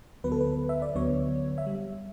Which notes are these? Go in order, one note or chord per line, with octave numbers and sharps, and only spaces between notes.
D2 D3 F#3 B3 B4
A4
B4
E5
D5
D2 D3 F#3 B3 C#5
E5
G3